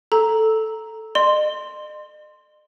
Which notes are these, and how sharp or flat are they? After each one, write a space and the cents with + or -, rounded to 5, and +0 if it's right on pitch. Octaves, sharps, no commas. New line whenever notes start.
A4 +0 A#5 +0
D#5 -40 C6 +0